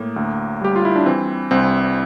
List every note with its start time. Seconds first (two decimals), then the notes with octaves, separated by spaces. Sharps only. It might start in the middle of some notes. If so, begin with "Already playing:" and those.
Already playing: A2 A#3
0.16 D2
0.61 G3 G4
0.76 F4
0.85 E4
0.96 D4
1.06 E3 C4
1.51 C2 C4